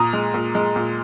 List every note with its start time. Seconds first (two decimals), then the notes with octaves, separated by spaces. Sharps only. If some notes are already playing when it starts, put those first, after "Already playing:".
Already playing: A#2 A#5 D#6
0.13 G#3
0.34 A#2
0.55 G#3
0.76 A#2